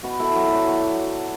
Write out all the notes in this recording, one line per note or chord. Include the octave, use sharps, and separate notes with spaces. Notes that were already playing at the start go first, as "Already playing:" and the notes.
B2 F#4 B4
B2 E4 A4
F#3 F#4
A4
F#3 D4 F#4
F#3